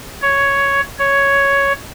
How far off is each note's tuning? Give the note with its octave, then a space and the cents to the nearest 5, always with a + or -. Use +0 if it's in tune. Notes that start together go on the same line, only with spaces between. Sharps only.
C#5 +5
C#5 +5